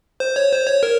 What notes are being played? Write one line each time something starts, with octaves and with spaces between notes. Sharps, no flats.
C5
C#5
C5
C#5
A#4